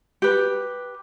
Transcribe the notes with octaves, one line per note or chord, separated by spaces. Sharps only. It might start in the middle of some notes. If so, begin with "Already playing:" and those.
G4 B4